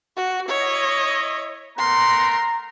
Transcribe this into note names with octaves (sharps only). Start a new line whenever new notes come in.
F#4
E4 C#5 D#5
A3 B3 A#4 A#5 C6